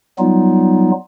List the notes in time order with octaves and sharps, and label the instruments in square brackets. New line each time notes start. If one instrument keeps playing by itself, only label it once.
[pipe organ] F#3 G3 B3 D#4 F4